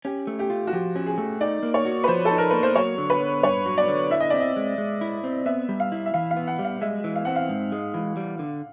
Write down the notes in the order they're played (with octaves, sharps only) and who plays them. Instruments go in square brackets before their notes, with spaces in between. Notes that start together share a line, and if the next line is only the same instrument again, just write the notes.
[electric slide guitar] C#4 [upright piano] G4
[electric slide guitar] A3
[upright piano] G4
[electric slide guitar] F4
[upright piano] F#4
[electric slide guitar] F3 [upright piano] G4
[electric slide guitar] C#4
[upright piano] G#4
[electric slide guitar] A3
[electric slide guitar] D#4 [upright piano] D5
[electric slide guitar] A#3
[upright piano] C#5
[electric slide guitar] F#4
[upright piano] B4
[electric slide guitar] F3 [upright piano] C5
[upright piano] A4
[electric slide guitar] D#4
[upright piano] A#4
[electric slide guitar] A#3 [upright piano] B4
[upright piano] C5
[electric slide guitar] F#3 [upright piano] C#5
[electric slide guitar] D3
[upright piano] B4
[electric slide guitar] B3
[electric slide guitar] G2 [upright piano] C#5
[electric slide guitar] F#3
[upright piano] D5
[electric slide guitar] D3
[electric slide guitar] E4 [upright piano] E5
[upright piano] D#5
[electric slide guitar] C4 [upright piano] D5
[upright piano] D#5
[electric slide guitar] G#3
G#3
E4
C4
[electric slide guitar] B3 [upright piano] E5
[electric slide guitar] G3
[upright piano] F5
[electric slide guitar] E4
[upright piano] E5
[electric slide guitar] E3 [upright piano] F5
[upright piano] F5
[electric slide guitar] B3
[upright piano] F#5
[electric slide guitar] G3
[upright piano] F5
[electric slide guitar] G#3 [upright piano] E5
[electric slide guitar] E3
[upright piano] F5
[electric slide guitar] C4 [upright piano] F#5
[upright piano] F5
[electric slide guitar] G#2
G#3
E3
G3
D3